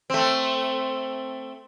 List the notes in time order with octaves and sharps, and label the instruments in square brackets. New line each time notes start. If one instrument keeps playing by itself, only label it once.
[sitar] A3 C4